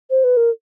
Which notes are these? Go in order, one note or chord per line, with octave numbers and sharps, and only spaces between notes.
C5
B4
A#4